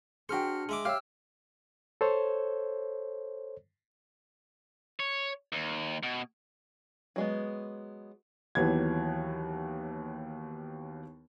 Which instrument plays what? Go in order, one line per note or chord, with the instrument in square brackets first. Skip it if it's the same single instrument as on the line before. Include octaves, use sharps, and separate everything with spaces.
[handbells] D4 F6 C#7 [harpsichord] F#4 C5 [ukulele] G#4 G5
[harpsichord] G#3 E5 D6
[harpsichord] G4 [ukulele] C#5 E5 F5 [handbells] E6 F6
[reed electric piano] A4 C5 C#5
[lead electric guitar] C#5
D#2
B2
[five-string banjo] F#3 G#3 B3
[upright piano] D#2 E3 F#3 B3 G#6